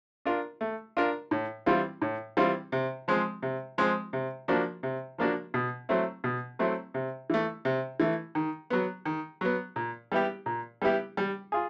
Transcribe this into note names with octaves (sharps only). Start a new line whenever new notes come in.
D4 F4 A#4
A3
D4 F4 A#4
A2
E3 G3 C4 F4
A2
E3 G3 C4 F4
C3
F3 G#3 C4
C3
F3 G#3 C4
C3
F3 A#3 D4 F#4
C3
F3 A#3 D4 F#4
B2
F#3 A3 C4 E4
B2
F#3 A3 C4 E4
C3
E3 A3
C3
E3 A3
D#3
F#3 B3
D#3
F#3 B3
A#2
G3 B3 E4 G4
A#2
G3 B3 E4 G4
G3
F4 G#4